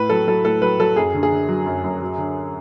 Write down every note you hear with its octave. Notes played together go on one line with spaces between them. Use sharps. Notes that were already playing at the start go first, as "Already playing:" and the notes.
Already playing: A2 B4
F#3 A4
F#3 A4
A2 A4
F#3 B4
F#3 A4
F#2 G#4
D3
G#4
D3
F#3
F#2
F#2
F#3
D3